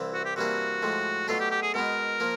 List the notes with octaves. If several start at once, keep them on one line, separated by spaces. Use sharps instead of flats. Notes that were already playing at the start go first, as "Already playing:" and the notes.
Already playing: C2 C3 E3
F#4
G4
C3 E3 G3 A#3 D4 F#4
A2 F3 G#3
B2 F#3 A3 D4 F4
G4
G4
G#4
B2 G#3 B3 A#4
F3 A#3